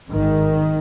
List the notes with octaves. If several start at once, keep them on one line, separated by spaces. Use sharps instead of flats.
G#1 G#2 D#3